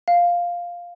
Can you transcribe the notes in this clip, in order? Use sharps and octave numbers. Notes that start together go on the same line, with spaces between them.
F5